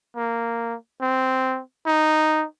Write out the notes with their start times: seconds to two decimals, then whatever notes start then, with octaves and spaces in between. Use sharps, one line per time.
0.16 A#3
1.01 C4
1.86 D#4